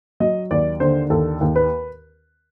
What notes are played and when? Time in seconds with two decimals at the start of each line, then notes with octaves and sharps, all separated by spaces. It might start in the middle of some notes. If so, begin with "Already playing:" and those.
0.20 F#3 D#5
0.51 D#2 D5
0.80 D3 C5
1.10 D#2 A4
1.41 D#2
1.56 B4